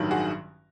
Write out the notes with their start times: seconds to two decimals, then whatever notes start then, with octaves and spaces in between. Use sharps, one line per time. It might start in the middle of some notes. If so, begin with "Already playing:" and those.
Already playing: A1 G2 D#3 F#3
0.11 F#4 G#4